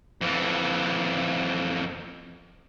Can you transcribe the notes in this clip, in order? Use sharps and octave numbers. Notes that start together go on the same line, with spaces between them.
F2 E3